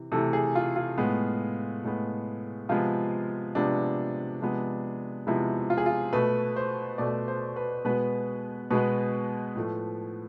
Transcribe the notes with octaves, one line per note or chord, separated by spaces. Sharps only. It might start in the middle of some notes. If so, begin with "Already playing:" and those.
Already playing: C3 E3
C3 E3 A3 A4
G#4
F4
F4
A2 G#3 B3
A2 G#3 B3
C3 F3 G#3 B3 F4
C3 F3 G#3 B3 D4
C3 F3 G#3 B3
C3 F3 G#3 B3 E4
F4
G#4
F4
B2 A3 B4
C5
B2 A3 D5
C5
B4
B2 G#3 B3 B4
B2 G#3 B3 B4
A2 F3 A3